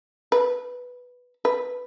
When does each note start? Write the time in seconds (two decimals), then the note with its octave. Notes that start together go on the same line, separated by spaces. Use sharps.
0.32 B4
1.45 B4